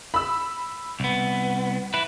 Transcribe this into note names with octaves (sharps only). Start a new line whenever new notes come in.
B5 E6
C2 B3
E4 B4